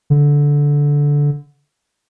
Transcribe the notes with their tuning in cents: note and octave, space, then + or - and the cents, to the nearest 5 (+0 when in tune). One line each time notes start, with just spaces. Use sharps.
D3 -15